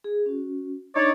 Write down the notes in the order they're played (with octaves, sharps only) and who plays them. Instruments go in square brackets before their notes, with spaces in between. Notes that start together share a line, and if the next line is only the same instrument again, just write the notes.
[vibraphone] G#4
C#4 F#4
[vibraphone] D4 [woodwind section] D#4 C#5 D5